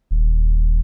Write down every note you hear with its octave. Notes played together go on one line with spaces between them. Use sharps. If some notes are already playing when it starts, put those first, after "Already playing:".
D#1